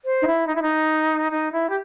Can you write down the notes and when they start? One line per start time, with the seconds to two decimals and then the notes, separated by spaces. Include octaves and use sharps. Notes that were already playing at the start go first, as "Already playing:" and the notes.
0.05 C5
0.20 D#4
0.26 E4
0.47 D#4
0.54 E4
0.62 D#4
1.30 D#4
1.52 E4
1.69 G4